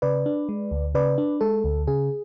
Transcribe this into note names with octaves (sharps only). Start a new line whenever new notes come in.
C#3 B4 D5
D4
G#3
D2
C#3 B4 D5
D4
G#3 A4
D2
C#3 G#4